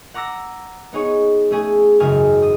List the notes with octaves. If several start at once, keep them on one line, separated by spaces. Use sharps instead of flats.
F#5 A#5 D6 E6 A#6
B3 D#4 G#4 C#5
A3 C#4 G#4 G#5
G#1 F#2 C#3 G#4 G#5 F6
D#6